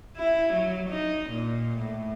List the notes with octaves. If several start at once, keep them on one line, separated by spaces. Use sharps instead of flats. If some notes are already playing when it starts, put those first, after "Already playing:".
E4
F#3
D#4
A#2
A2